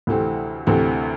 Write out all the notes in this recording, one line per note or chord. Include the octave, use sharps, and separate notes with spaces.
D2 C3 E3 A3 C4
D2 C3 E3 A3 C4